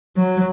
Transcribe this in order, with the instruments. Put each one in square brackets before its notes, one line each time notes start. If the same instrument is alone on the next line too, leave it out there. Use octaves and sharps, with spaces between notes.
[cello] F#3